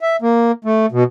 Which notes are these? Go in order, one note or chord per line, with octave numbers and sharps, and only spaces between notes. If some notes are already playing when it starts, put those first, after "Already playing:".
E5
A#3
A3
B2